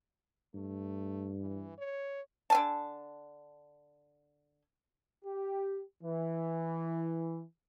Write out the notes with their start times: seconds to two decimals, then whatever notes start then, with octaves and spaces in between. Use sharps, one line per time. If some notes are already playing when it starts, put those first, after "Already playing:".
0.55 G2 A3
1.40 E3
1.78 C#5
2.50 D3 G#5 A5
5.25 G4
6.03 E3